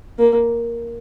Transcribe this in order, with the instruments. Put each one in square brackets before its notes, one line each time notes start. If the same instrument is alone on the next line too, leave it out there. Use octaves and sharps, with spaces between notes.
[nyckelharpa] A#3